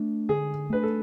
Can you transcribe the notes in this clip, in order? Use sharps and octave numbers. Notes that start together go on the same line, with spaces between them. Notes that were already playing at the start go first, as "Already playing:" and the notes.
Already playing: A3 D4
D3 G#4
A3 D4 B4
A4